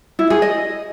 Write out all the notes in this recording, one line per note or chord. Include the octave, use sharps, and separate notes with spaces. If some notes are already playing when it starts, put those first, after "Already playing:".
E4
G#4
D#5